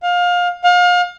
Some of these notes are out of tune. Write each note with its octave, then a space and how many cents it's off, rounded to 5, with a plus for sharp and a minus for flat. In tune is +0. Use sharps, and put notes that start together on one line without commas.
F5 +25
F5 +35